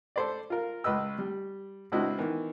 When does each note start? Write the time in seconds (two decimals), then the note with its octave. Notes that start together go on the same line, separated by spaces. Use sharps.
0.16 A4 C5 D5
0.50 F4 A#4
0.84 C#2 B4 D#5 E6
1.18 G3
1.92 C#2 C4 D4 E4 F#4 D#5
2.18 D#3 E3 B3